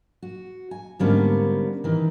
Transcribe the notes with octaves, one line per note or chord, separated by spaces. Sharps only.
F#4
G#5
G#2 D3 G3 A#3 B3 C#4
D#3 E3